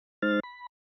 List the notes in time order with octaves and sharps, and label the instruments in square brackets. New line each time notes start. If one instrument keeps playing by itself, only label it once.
[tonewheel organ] G#3 D#4 C5 F6 A6
B5